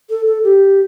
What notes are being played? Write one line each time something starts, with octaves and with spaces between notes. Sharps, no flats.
A4
A4
G4